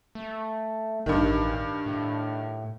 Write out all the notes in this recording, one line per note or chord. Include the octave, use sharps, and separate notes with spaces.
A3
A1 G2 D#3
A2